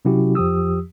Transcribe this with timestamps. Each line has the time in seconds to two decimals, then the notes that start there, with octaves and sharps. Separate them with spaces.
0.05 C3 F#3 C#4 E4 F#4 G4
0.35 F2 F3 G4 D#6 E6